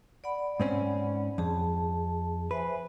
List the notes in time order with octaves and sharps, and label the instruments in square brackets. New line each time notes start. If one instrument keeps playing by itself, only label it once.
[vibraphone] D5 F#5 B5
[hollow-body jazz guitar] G#2 C4 C#4
[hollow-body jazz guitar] F2 [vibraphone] G#4 A5
[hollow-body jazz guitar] B4 [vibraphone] C5 E5 G#5